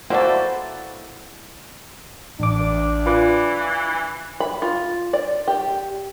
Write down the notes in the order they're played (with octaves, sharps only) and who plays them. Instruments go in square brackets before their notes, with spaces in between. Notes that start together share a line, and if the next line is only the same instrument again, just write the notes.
[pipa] A#3 A4 [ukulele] E4 B4 E5 [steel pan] F#4 D5 [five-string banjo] C5
[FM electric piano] A1 D6 [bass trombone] D4
[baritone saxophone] E3 [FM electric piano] F4 B4 D6
[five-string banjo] B5
F4
D5
G4